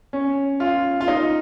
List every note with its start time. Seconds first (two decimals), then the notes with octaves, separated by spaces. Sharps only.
0.13 C#4
0.60 F4
1.01 F4
1.08 D#4